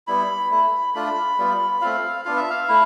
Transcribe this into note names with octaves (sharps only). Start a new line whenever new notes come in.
G3 B3 E4 B5
A3 E4
A3 D4 F4 B5
G3 B3 F4
A3 C4 F4 F5
B3 D4 F4 F5
E5
F5
A3 E4